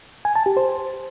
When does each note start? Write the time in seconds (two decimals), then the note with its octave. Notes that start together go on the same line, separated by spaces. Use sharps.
0.25 G#5
0.36 A5
0.46 G4
0.57 C5